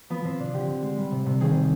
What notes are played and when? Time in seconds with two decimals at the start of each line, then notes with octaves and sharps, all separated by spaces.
0.10 F3 B3
0.25 F3 C4
0.40 C3 D4
0.54 D3 G4
0.68 D3
0.83 G#3
0.98 G3
1.12 C3
1.26 C3
1.40 D#3 G#4
1.55 C3